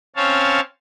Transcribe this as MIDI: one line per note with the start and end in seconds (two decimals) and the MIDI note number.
0.16 0.60 60
0.16 0.60 61
0.16 0.60 73
0.16 0.60 77
0.16 0.60 81